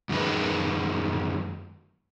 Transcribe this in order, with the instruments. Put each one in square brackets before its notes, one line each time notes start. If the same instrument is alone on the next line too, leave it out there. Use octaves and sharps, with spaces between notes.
[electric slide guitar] F#2 D#3 G#3 B4